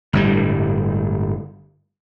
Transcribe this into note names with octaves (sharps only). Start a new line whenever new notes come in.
G1 A2 G3